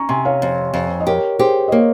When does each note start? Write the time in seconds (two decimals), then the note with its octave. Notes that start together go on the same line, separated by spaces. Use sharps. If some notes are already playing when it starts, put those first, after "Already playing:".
Already playing: C#4 A#5 C#6
0.09 C3 G#5 C6
0.25 C#5 F5
0.42 F2
0.74 F2
1.00 D#5
1.07 G4 A#4 C#5
1.39 G4 G#4 C5
1.68 D#5
1.72 A#3 A#4 C#5